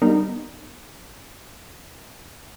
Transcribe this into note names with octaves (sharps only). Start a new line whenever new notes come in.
G3 B3 D#4 A#4